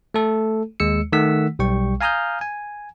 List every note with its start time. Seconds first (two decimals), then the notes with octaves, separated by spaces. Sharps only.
0.14 A3 A4
0.80 D#2 G#3 E6 C#7
1.13 D#3 A3 F#5 E6 B6
1.59 B1 G3 G5 C#6
2.01 F5 G#5 A#5 D#6 F6 G6
2.41 G#5